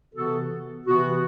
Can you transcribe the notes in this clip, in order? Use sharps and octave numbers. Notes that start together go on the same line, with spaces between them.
C3 E3 B3 F#4 A4
C3 E3 B3 F#4